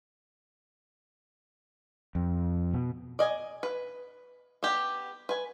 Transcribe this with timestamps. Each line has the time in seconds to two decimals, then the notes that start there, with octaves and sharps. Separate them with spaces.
2.15 F2
2.74 B2
3.19 D5 D#5 G#5
3.63 B4
4.63 B3 G4
5.29 B4 G#5